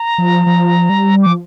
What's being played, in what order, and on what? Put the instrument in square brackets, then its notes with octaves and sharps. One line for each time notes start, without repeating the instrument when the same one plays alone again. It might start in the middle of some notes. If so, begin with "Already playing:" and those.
Already playing: [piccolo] A#5
[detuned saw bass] F3
F3
G3
[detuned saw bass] F3 [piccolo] D6